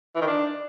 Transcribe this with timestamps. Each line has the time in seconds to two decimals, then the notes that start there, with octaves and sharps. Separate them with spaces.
0.15 E3
0.21 D#3
0.27 D4